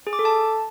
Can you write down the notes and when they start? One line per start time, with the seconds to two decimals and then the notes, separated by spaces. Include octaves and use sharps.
0.07 G#4
0.13 D6
0.19 A4
0.25 A5